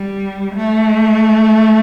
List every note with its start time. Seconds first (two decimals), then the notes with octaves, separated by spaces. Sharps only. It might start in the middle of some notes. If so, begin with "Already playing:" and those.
Already playing: G3
0.55 A3